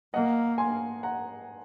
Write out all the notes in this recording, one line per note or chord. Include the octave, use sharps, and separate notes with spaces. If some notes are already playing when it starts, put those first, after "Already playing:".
A#3 D#5 F#5
G#5 C6
F#5 A#5